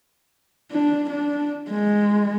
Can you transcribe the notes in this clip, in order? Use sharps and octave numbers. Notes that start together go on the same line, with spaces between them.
D4
D4
G#3